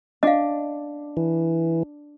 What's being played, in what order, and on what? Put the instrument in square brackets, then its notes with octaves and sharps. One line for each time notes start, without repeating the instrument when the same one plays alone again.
[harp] D4 [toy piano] D#5 F5
[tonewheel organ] E3